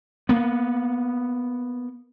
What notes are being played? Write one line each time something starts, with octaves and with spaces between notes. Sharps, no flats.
A#3 B3